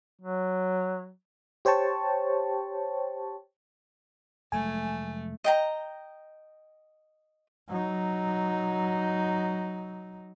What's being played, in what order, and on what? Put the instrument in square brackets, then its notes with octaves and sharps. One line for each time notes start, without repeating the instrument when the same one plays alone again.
[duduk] F#3
[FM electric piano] G4 C5 C#5 G5 A5 C#6
[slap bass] F1 F#3 G#3 [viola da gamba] A3 [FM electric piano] G#5
[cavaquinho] D#5 G5 A#5
[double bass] F#3 D#4